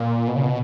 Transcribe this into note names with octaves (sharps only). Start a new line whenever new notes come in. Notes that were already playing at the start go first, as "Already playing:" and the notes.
Already playing: A#2
B2
C#3
B2